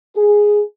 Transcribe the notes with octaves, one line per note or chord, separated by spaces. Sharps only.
G#4